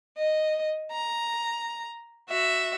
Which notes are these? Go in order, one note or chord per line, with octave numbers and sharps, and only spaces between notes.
D#5
A#5
F#4 E5